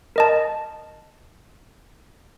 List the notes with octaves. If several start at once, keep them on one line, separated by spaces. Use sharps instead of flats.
A#4 D#5 A5